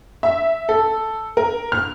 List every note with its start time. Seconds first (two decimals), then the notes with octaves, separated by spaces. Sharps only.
0.23 E5
0.69 A4
1.37 A#4
1.72 F6